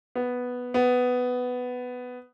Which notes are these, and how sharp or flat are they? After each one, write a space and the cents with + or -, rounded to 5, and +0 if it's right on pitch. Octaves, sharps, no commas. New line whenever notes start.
B3 +0
B3 +10